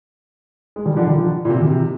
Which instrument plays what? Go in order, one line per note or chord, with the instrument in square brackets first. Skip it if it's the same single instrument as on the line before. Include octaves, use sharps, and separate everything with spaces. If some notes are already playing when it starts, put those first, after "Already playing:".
[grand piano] G#3
D#3 G3
D3 F3
D#3 G3
D3 F3
A#2
C3
C3 D#3
C3